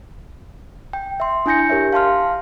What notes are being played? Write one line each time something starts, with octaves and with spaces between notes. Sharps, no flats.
G5
E5 C6
D4 E4 G#5 G6 A#6 C#7
G4 A#4 C#5 E5
F5 A5 C6 F6